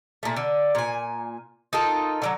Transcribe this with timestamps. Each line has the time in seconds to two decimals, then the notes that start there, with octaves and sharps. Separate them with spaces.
0.23 A#2 A3
0.37 D3
0.75 A#2 G#5
1.73 D#4 F4 A4 A#4
2.22 D3 D#3 F#3